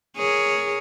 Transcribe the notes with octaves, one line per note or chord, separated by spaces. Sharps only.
G#4 A#4 C#5